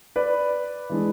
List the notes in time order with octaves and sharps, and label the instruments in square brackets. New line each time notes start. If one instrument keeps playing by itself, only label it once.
[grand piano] B4 D5
[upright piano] E3 G#3 D4